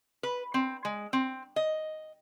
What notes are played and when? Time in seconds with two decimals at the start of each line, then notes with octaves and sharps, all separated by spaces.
0.23 B4
0.54 C4
0.85 G#3
1.13 C4
1.56 D#5